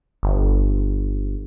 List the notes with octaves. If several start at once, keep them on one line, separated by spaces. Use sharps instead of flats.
G1